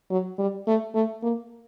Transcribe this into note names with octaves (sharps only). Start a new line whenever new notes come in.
F#3
G3
A3
A3
A#3